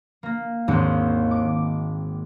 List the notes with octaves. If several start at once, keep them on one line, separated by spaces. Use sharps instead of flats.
A#3 A#6
G#1 D#2 G#2 G#3 C4 C#7
D6